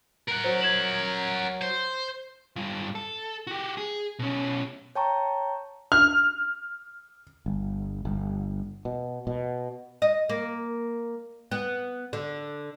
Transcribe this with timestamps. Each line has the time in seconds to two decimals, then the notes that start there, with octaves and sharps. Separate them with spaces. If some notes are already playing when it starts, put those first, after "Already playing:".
0.29 A#4 F#5
0.44 F#3 C5
0.61 G#6 E7 F#7
1.62 C5
2.56 G2 F4
2.95 A4
3.47 F#4 G4
3.77 G#4
4.19 B2 C#4
4.95 C#5 G5 A5 A#5 C#6
5.92 F6
7.46 G1
8.05 G1
8.85 B2
9.27 B2
10.02 D#5
10.29 A#3
11.51 B3
12.13 D3